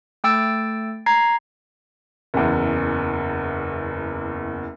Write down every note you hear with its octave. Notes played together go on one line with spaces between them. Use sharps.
A3 G5 E6 A6 D7
A#5 G#6 C7
F#1 E2